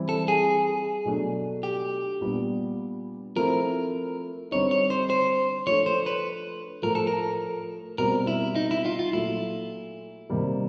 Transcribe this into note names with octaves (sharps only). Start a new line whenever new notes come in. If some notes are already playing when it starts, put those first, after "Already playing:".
Already playing: E3 G3 C4 E4
A4
G#4
B2 F#3 A3 D4
G4
A#2 G3 B3 D4
F3 A3 C4 E4 A#4
D3 G3 C4 D#4 C#5
C#5
C5
C5
F3 A3 D4 C#5
C5
B4
A2 F3 A3 A#4
A4
A#4
B2 G3 C4 A#4
E4
D#4
E4
F4
F4
A#2 F#3 A3 E4
C3 D#3 G3 A#3